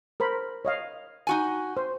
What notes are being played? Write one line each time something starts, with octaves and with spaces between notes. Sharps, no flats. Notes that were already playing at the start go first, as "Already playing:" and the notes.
A#4 C5 B5
C#5 D#5 F5
D#4 F#4 G#5
C5